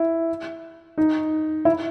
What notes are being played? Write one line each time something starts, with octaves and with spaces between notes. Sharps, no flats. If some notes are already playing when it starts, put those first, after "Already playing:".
Already playing: E4
D#4
E4